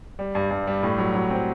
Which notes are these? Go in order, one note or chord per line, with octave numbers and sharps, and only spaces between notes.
G3
G2
G2
G3
A2
F#3
F#3
C4